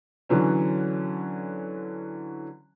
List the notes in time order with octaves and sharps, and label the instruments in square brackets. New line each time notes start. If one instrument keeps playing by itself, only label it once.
[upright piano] D3 E3 F#3 C#4